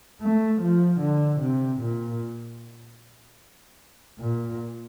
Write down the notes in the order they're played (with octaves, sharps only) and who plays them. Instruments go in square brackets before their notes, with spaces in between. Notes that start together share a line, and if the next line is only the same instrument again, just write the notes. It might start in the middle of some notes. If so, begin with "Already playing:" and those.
[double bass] A3
F3
D3
C3
A#2
A#2